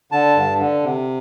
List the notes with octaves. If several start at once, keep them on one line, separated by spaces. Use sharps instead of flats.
D3 A5
G2
D3
C3